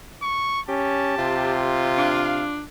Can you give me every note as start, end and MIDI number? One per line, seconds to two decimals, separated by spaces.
0.22 0.61 85
0.68 1.17 61
0.68 1.78 67
0.68 1.60 81
1.19 2.45 48
1.19 2.67 65
1.98 2.63 62
1.98 2.42 77